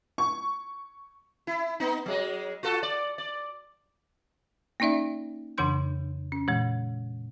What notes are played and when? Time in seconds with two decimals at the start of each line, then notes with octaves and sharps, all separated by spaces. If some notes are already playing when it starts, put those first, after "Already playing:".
0.18 C#6
1.47 E4
1.80 B3 D#4
2.06 F#3 G#3 D#5
2.63 F4 F#4 A4
2.83 D5
3.18 D5
4.80 A#3 C#4 D#4 D5 E5
5.58 F2 C#3 E3 D4 C6 G6
6.32 C#4
6.48 A#2 E3 G#3